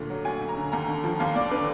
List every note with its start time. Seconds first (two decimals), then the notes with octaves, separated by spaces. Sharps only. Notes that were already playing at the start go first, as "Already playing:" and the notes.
Already playing: D2 A#2 D3
0.10 F#3
0.25 D2 G#5
0.41 D2
0.49 A#5
0.57 D3
0.72 D#2 A#5
0.88 D3
1.04 F3
1.19 D#2 F5
1.35 D#2 D5
1.51 D3 B4